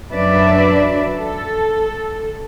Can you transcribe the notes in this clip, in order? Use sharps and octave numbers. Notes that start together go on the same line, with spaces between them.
F#2 F#3 D4 B4 D5 E5
A4